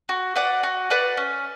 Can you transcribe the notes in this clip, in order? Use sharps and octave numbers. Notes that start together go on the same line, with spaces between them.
F#4
B4 D5 F#5
F#4
B4 D5 F#5
C#4